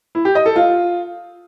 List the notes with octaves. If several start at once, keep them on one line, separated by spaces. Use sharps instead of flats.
E4
G4
D#5
A4
F4